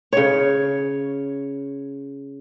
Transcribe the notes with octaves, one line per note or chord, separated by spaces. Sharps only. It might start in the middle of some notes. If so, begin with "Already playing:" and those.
C#3 C#5